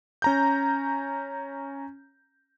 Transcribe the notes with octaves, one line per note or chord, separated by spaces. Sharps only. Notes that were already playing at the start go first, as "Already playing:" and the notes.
C#4 A#5 G6